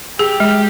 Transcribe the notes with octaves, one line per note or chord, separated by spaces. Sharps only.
G4 G#4
G#3